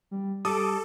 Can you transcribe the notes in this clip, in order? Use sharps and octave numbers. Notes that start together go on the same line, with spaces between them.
G3
G3 A4 D6 D#6